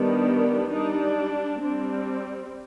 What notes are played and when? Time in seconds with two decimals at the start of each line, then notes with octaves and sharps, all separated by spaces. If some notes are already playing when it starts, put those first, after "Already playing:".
Already playing: D#3 G3 B3 D4
0.73 G3 D4 D#4
1.62 G3 C4 D4